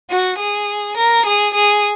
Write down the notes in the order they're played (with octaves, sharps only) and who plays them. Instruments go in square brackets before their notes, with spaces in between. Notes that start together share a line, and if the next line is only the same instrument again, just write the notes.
[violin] F#4
G#4
A#4
G#4
G#4